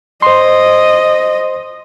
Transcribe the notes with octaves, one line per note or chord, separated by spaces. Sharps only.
C5 D#5 C6